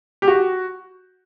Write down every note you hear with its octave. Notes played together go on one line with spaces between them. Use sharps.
G4
F#4